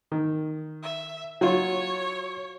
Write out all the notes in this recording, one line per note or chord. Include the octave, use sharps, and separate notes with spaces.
D#3
E5
F#3 F4 C#5